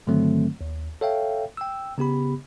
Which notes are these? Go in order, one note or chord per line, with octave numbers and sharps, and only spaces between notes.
G2 D3 D#3 F#3 A3 C4
D#2
A4 C#5 E5 F5 G5
G5 E6
C#3 B3 G4 B5